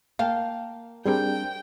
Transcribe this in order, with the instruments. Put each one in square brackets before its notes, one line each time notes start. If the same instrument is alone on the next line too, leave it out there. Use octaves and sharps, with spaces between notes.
[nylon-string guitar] A#3 G5 A5 [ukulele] F5
[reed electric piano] G3 C4 D4 [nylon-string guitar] G#4 A#4 [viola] G5